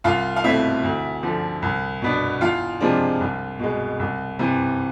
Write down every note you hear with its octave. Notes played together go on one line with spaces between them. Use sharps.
C2 F4 F5
F5
B2 A3 C4 E4 E5
D2
D3 F3
C2
B2 B3 D4
E2 F4 F5
C3 F3 G#3 D4
C2
B2 G#3
C2
C3 E3